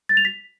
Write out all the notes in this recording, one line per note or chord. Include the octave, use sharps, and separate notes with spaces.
A6
F7
B6